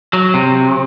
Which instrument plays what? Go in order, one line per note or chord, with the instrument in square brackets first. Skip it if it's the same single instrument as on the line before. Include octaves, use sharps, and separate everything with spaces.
[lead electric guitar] F#3
C3